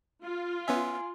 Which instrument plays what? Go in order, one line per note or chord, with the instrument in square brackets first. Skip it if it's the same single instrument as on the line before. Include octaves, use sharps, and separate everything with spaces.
[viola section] F4
[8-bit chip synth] B3 C#4 E5 [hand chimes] G#5 C6